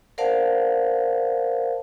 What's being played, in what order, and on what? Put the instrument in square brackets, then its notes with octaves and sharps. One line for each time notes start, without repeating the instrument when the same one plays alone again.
[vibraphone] A#4 C5 D5 F5 F#5 A5